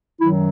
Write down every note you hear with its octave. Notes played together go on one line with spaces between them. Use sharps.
F#2 D#3 F#3 E4